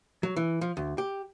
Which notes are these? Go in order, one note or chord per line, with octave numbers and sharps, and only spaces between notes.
F#3
E3
F3
D2
G4